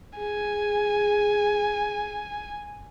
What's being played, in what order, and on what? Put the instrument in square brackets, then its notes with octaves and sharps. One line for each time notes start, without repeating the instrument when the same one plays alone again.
[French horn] G#4 [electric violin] G#5